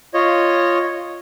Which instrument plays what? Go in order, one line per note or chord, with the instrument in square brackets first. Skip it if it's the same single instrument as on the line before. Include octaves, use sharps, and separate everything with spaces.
[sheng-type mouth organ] F4 C#5 D#5